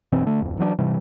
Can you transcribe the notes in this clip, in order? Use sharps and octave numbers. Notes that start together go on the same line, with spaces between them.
F#1 B2 E3 C4
D3 A3
D1 F2
E3 F#3 A#3 D4
G#2 C3 E3 G3